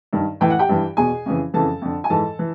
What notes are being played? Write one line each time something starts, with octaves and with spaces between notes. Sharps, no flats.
G2 D#3
A2 E3 G5
F#5
G4 G5
G2 E3
E2 B2 G#4 G#5
F2 C#3 E3
F2 C#3 E3 A4 A5
F2 D3
G#5
G#2 E3 A4 A5
E3